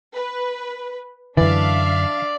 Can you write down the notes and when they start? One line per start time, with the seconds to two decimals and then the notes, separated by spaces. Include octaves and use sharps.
0.15 B4
1.37 F#2 D3 E3 D4 D5 E5 F5